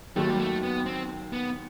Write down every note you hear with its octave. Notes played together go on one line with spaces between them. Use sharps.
D#2 D#3 F#3 A3
G3
A3
B3
C4
B3